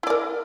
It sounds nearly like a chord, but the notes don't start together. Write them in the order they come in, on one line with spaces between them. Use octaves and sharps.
E4 D5 A#4